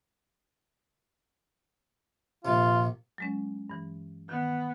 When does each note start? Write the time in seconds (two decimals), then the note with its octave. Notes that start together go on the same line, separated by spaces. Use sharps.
2.45 A#1 C3 F4
3.18 F#3 G#3 C#4
3.70 G2 E3
4.29 D#3 B3